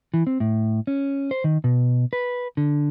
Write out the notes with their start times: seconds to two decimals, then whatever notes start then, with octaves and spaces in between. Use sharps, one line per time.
0.14 E3
0.27 C4
0.40 A2
0.87 C#4
1.31 C5
1.44 D#3
1.64 B2
2.13 B4
2.57 D3